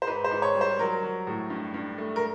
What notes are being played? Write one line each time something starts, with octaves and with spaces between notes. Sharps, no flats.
C5
G#2 B4
C5
G#2
C#5
G3
C5
F#3 A#4
F#3
A2
G2
G2
A3
A#4